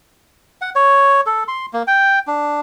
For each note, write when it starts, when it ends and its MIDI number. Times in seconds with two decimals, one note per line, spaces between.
0.61 0.70 78
0.75 1.21 73
1.26 1.44 69
1.48 1.66 84
1.73 1.83 58
1.87 2.19 79
2.27 2.61 62